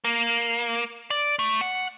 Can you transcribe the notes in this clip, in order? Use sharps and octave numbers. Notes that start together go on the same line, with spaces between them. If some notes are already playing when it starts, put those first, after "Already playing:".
A#3
D5
A3
F#5